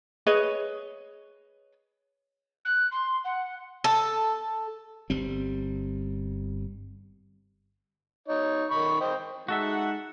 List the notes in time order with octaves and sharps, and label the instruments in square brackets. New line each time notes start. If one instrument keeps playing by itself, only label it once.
[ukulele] G#4 B4 C#5 D#5
[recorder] F#6
C6
F#5
[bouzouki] A4
[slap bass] G1 G3 C4
[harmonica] D#4 C#5
D#3 B5 C#6
C5 D#5 G5
[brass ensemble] G#3 D#4 F#5 [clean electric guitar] F#4 A4 E5